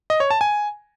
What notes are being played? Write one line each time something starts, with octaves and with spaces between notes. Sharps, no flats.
D#5
C#5
A5
G#5